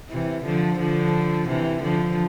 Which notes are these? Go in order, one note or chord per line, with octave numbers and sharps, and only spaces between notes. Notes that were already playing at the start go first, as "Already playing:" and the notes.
C3 E3
D3 F3
D3 F3
C3 E3
D3 F3